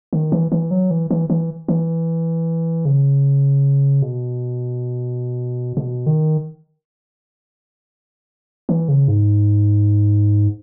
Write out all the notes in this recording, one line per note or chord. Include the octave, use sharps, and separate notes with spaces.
D#3
E3
E3
F#3
E3
E3
E3
E3
C#3
B2
B2
D#3
E3
C#3
G#2